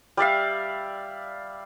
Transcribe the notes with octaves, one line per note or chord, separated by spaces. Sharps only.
G3 D5 E5 F5